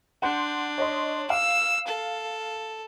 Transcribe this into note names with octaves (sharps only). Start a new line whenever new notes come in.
D4 F#5 C6 G6
C#5 D#5 C6
F5 E6
A4